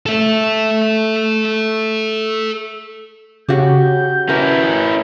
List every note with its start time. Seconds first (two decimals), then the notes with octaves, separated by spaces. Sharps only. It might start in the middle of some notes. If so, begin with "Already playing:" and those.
0.06 A4 E5
3.49 C#3 F#4 G4 G6
4.29 C#4 E4 A#4 B4